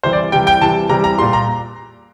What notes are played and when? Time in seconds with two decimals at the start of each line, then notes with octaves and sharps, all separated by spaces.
0.03 C3 E3 G3 C5
0.13 D5
0.32 C3 E3 G3 G5
0.47 G5
0.61 C3 E3 G3 A5
0.89 C3 E3 G3 A#5
1.04 A#5
1.18 A#2 G3 C6
1.33 A#5